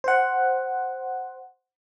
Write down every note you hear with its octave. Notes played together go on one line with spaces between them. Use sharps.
C5 F#5